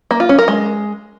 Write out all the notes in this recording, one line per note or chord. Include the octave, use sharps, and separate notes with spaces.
A#3
F4
C#4
A#4
G#3